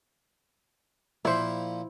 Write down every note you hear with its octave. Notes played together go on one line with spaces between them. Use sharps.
A#2 F3 E4 C5